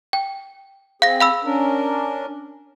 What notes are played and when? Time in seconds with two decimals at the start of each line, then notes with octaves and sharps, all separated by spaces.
0.13 G5
1.02 C4 G#4 F5 A#6
1.21 F5 B5 E6
1.44 C#4 D4 A#4